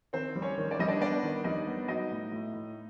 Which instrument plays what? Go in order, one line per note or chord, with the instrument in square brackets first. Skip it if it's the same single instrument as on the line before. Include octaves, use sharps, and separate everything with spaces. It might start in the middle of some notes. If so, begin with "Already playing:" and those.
[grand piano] D#3 [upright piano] C4 C5
[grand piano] G3
[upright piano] C#4 C#5
[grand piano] D#3
[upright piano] D5
[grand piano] G3 [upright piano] D#5
[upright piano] D4 D5
[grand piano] B3 [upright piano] D4 D5
[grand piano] D#3
[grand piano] G3 [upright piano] D#4 D#5
[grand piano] B3
[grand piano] F#3 [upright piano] D#4 D#5
[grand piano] A2
A2
A2